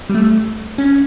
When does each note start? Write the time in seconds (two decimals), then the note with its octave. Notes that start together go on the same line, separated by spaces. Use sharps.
0.09 G3
0.15 A3
0.78 C#4